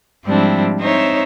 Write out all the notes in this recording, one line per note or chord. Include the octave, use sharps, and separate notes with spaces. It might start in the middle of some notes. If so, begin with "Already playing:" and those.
G#2 F3 G3 C4 D4 E4
C4 D#4 C5 C#5 E5